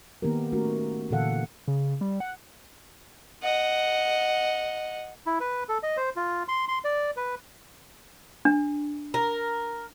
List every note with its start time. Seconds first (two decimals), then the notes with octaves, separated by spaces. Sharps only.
0.22 D#3 A#3 B3 D#4 G4 A#4
0.52 A3 C#4 F#4 A#4
1.11 A#2 D3 E3 A4 F5 F#5
1.68 C#3
2.01 G3
2.20 F#5
3.43 D#5 F#5
5.26 E4
5.40 B4
5.69 A4
5.83 D#5
5.97 C5
6.16 F4
6.48 C6
6.68 C6
6.84 D5
7.17 B4
8.45 D4
9.14 A#4